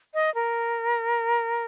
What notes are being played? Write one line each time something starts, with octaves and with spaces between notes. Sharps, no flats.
D#5
A#4